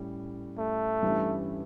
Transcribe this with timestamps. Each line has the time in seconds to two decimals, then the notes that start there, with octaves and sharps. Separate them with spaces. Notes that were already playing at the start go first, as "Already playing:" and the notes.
Already playing: A2 G3 C#4
0.59 A3
1.03 G2 E3 G3 C#4 E4